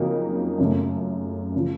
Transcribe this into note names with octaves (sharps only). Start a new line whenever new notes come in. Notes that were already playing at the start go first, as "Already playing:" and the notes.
Already playing: F2 C#3 F#3 A#3 D#4
F#2 C#3 A3
C#3 F3